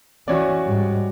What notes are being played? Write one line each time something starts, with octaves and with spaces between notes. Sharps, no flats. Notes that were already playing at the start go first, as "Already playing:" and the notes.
E3 C#4 F#4 C#5 D5
G#2 G3